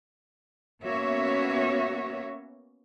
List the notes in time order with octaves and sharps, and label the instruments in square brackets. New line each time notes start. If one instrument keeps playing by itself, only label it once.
[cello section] A#3 B3 C#4 F#4 C#5 E5